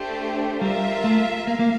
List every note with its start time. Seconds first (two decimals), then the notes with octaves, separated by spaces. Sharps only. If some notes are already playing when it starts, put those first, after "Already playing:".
Already playing: A3 D4 G4 C5
0.60 G3 F4 A#4 E5
1.04 A3
1.47 A#3 F5
1.59 A#3